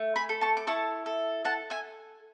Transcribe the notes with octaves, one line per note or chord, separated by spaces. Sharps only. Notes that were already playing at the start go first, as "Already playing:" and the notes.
Already playing: A3
G#5 B5
A4
A5 C#6
D6
E4 A5 C#6
A4
A4 F#5 A5
E5 G#5